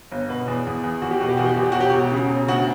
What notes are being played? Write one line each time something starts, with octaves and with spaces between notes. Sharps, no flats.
G1
B2 B4
E2
E2
E2
E2 F#4
G4
B2 F#4
G4
E2 F#4
G4
E2 F#4
G4
E1 F#4
G4
E1 F#4
C#3
E1
D2 F#4